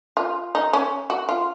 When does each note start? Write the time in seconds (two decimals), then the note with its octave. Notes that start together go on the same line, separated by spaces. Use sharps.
0.17 F4
0.55 D#4
0.73 C#4
1.10 F#4
1.29 F4